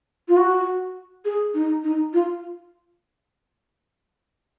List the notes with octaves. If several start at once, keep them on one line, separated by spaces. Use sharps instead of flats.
F4
F#4
G#4
D#4
D#4
F4